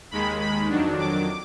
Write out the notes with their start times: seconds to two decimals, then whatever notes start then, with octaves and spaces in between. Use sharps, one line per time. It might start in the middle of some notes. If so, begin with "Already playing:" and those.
0.11 D#2 D#3 G#3 B5
0.40 B5
0.69 F2 D#3 F#3 D4
0.98 D6